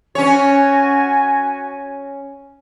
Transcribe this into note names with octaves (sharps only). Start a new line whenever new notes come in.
C#4 F#4 C#5 G#5